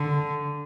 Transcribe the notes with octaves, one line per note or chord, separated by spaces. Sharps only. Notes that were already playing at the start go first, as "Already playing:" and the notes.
Already playing: D3